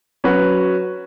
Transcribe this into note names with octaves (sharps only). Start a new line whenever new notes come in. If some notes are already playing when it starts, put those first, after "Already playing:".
F#3 C#4 F#4 B4